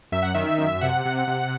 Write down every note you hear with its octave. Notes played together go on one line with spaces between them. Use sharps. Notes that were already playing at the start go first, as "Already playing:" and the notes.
F#2 E5
F#5
D#3 E5
F#2
C3 F#5
C3
F#5
C3